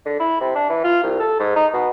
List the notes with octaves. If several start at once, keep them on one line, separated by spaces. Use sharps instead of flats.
D3
E4
C3
D4
E3
F4
C2
A4
G#2
D#4
B2